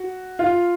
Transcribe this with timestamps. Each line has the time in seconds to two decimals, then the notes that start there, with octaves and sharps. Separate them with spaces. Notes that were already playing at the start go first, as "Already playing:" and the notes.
Already playing: F#4
0.39 F4